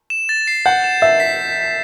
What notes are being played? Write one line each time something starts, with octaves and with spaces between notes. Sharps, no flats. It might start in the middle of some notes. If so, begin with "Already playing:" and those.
E7
A6
C7
F#5 G6
E7
E5 G6
B6